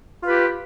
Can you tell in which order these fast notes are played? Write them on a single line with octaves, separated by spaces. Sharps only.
F4 B4 G4